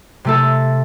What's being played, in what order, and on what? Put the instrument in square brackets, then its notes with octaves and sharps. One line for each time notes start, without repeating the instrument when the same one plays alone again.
[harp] C3 A3 A4